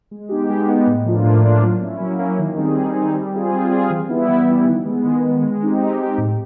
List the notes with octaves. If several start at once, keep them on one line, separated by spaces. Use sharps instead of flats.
G#3
B3 D#4 G4
G#3
B3 D#4 G4
A2
F3 A#3 D4 F4
A2
F3 A#3 D4 F4
F#3
A#3 C#4 E4
F#3
A#3 C#4 E4
D#3
G3 C4 D#4 G#4
D#3
G3 C4 D#4 G#4
G3
C4 F4 G#4
G3
C4 F4 G#4
E3
G3 B3 E4
E3
G3 B3 E4
D#3
G#3 B3
D#3
G#3 B3
G#3
C4 D#4 G4
G#3
C4 D#4 G4
A2